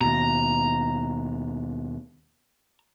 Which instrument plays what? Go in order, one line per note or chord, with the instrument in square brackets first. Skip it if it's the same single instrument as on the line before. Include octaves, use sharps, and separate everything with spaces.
[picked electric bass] D#2 B2 [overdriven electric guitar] A#5